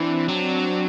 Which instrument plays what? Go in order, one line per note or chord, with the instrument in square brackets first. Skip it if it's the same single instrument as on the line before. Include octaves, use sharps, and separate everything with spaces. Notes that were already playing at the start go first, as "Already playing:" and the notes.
Already playing: [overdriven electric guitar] E3 [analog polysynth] C4 D4
[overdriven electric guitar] F#3